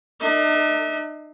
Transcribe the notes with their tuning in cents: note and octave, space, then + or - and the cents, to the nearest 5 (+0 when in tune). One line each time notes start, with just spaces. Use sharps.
D#4 -45 E5 -45